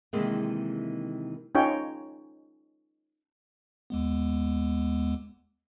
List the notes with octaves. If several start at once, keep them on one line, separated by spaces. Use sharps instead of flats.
C3 D#3 E3 G#3 A#3
C#4 D#4 F4 G#4 C#5 G5
D#2 G#3 B3